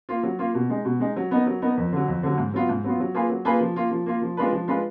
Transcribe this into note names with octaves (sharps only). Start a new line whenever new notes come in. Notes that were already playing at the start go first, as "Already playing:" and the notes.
A#3 F4
F#3
A#3 F4
B2
G#3 D#4
B2
G#3 D#4
F#3
B3 D#4 A#4
F#3
B3 D#4 A#4
F2
D3 F#3
F2
D3 F#3
G#2
F#3 B3 F4
G#2
F#3 B3 F4
F#3
A#3 F4 G#4 B4
F#3
A#3 F4 G#4 B4
F3
A#3 F4
F3
A#3 F4
F3
G#3 D4 F4 B4
F3
G#3 D4 F4 B4